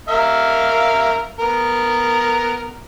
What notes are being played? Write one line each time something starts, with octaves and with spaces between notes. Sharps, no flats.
A#4 E5 F5
B3 A#4